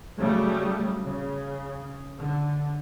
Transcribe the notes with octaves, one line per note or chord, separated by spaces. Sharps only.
C#3 F#3 G3 A3
C#3
D3